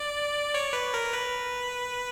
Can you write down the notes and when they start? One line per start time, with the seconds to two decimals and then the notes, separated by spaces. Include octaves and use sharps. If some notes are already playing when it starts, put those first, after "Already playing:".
Already playing: D5
0.54 C#5
0.73 B4
0.94 A#4
1.13 B4